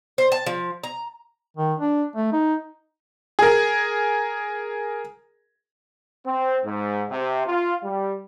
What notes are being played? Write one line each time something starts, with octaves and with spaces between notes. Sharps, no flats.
C5
A5
F3
A#5
D#3
D4
A3
D#4
G#4 A#4
C4
G#2
C3
F4
G3